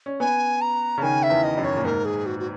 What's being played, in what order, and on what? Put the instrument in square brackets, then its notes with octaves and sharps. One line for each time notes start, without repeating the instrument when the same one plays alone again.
[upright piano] C#4
[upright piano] B3 [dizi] G#5
[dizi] A#5
[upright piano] C#3
[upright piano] D#3 [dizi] G#5
[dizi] E5
[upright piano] E2
[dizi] D#5
[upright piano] F#2
[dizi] C#5
[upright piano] A#2
[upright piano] G#2 [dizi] A#4
[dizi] G#4
F#4
F#4